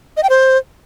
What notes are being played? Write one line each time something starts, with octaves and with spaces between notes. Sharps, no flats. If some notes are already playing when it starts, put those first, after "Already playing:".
D#5
G5
C5